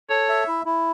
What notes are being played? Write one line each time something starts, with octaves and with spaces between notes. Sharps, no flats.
A4 C#5
E5
E4
E4